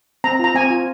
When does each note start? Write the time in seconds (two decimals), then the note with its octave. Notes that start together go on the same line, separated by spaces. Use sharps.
0.24 C4 A#5
0.39 F4 A#5
0.55 C4 G#5
0.70 F4